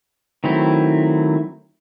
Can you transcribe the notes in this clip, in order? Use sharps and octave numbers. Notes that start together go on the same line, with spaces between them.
D#3 F#3 A3 C4 E4